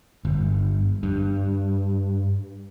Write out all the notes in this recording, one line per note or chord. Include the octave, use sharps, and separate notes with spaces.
G1
G2